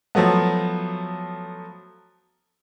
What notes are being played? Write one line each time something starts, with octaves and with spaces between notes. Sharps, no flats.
F3 F#3 A3 B3